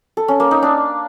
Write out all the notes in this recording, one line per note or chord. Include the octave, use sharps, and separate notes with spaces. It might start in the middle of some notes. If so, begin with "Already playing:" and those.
A4
C#4
A#3
D#4
D4